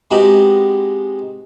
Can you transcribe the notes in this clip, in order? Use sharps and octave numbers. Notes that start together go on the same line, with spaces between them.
G#3 B3 C4 D#4 F#4 G4